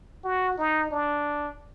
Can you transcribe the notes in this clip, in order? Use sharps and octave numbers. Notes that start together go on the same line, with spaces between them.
F#4
D#4
D4